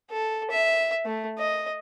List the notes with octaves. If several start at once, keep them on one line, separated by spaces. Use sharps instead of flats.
A4
E5
A3
D#5